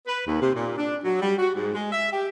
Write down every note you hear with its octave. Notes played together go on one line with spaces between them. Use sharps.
B4
D#2
C3
A#2
D4
F#3
G3
F#4
G#2
G#3
E5
G4